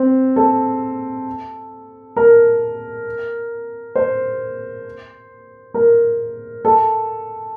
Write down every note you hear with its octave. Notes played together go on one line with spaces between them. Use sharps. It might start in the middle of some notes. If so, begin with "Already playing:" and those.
Already playing: C4
A4
A#4
C5
A#4
A4